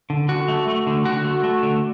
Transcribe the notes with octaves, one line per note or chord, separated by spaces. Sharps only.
D3
D3 F#4
A3
A3
D3
D3 F#4
A3
A3
D3